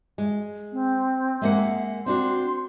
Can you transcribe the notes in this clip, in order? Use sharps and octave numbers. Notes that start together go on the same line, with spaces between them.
G#3
C4
G#3 A#3 E5 F#5
C4 D4 F#4 C6